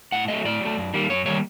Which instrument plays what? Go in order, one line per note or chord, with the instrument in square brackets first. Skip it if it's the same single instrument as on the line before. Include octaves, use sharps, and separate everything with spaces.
[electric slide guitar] A2 F#5
F#3 A3 D#5
A2 D5
F#3 A3
F#2
D#3 G3 A#3
F#2 C#5
D#3 G3 A#3 C#5